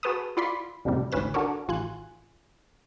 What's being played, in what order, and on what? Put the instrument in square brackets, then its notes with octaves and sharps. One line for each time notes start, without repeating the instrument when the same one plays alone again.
[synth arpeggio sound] F#4 G#4 B4 A5 B5 D#6
E4 F4 D5 F5 B5 C6
C2 F2 A2 C#3 G3
A1 D2 G#2 C#4 B4 E7
D4 F#4 A4 A#4 C#5
A1 F4 G#5 F#6